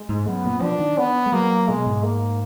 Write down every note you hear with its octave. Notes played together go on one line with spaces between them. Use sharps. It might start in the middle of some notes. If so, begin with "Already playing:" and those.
Already playing: G#3
G#2
F#2 B3
A#2
F3 D4
D#3
B3
G#3
F#3 A#3
B2 G#3
G#2
A#3